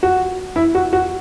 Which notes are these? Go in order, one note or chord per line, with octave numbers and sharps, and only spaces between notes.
F#4
E4
F#4
F#4